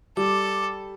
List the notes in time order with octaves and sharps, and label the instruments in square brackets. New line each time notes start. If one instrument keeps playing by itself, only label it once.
[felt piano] G3 [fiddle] A4 [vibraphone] D6